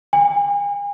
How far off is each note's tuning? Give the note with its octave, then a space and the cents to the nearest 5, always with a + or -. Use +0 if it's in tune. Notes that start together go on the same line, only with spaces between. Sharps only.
G#5 -40